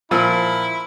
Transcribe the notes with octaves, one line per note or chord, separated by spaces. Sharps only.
A#2 F3 E4 E6